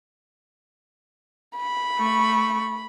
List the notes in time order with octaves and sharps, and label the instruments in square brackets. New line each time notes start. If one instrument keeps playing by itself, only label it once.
[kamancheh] B5
[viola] A3 C#6